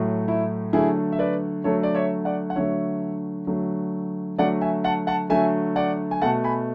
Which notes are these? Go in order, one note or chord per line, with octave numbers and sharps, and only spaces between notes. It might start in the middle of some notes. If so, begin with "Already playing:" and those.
Already playing: A2 F#3 A3
E4
D3 F#3 A3 E4 G#4
E5
B4 D5
D3 F#3 A3 A4 C#5
D5
C#5 E5
D5 F#5
F#5
D3 F#3 A3 C#5 E5
D3 F#3 A3
D3 F#3 A3 D5 F#5
E5 G#5
F#5 A5
F#5 A5
D3 F#3 A3 E5 G#5
D5 F#5
G#5
B2 A3 F#5 A5
G#5 B5